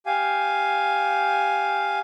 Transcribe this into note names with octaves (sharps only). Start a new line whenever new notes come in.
G4 F5 G#5